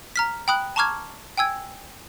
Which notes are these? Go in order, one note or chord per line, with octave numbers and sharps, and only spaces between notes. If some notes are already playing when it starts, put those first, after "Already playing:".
A#5 F6 B6
G5 B5 D#6 F#6 F#7
A5 A#5 C#6 D6 F6 G#6
G5 G#5 E6 G#6